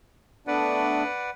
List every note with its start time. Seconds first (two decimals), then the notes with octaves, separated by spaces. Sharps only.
0.47 A3 B3 D4 B4 D5 F#5